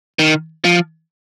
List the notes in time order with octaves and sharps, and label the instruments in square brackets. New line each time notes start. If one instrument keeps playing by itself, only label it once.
[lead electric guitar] D#3
F3